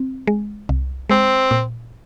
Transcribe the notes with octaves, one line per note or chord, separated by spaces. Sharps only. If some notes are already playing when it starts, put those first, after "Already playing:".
Already playing: C4
G#3
C2
G#3 C4
A#2